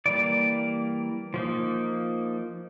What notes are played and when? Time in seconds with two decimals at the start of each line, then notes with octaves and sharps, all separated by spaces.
0.06 E3 G3 A#3 D5
1.34 F3 A#3 D#4